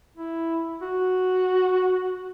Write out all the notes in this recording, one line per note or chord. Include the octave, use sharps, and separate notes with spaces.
E4
F#4